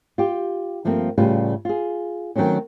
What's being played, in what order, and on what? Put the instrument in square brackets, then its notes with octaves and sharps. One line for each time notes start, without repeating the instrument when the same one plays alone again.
[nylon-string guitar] F4 G4
G2 F3 A3 A#3 C4
A2 C#3 G3 F4 B4
F4 G#4
D#3 F#3 A3 C4 C#4